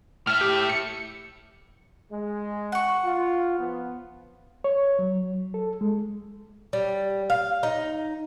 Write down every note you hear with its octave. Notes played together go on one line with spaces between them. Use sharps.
A2 E5 F6
G4
C#7
G#3
F#5 C#6
F4
F3 B3
C#5
F#3
A4
G#3
G3
F5
D#4